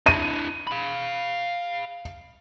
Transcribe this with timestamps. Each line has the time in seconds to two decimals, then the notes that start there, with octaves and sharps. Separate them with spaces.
0.06 D4 E4 D#7
0.67 F5 B5